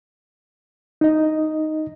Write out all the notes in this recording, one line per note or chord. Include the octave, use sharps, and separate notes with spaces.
D#4 D#5